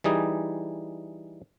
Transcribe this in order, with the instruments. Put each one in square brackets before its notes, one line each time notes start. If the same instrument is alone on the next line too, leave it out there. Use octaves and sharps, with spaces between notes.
[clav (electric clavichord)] E3 G3 D#4 G#4